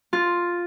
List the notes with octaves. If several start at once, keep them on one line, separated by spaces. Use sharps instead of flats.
F4